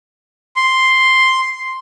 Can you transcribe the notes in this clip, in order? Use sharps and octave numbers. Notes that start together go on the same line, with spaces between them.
C6